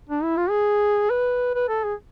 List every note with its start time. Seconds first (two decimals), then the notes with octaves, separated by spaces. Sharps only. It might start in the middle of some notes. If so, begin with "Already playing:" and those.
0.09 D4
0.23 E4
0.37 F4
0.50 G#4
1.10 B4
1.55 B4
1.68 A4
1.84 G#4